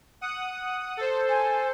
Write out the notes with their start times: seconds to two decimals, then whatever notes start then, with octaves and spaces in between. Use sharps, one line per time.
0.21 F#5 D#6
0.97 A4 C5
1.29 G#5